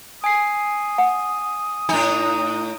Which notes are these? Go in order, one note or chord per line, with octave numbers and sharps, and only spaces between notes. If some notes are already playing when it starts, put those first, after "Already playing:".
G#5 D#6 C7
F#5
A2 D4 D#4